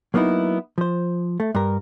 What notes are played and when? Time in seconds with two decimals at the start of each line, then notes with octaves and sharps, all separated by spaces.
0.14 F#3 A#3 B3 D#4 E4
0.78 F3 C5
1.40 A3
1.55 G2 A#4